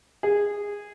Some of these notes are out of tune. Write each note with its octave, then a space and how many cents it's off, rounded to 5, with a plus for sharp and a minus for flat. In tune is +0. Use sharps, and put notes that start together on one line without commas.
G#4 -15